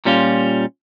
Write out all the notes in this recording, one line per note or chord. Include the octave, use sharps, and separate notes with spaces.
A#2 G3 C#4 F4